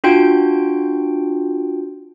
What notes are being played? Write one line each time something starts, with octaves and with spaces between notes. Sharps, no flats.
D4 F4 F#4 G5 G6 D7